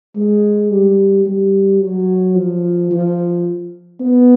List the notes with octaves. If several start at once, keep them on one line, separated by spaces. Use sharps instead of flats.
G#3
G3
G3
F#3
F3
F3
B3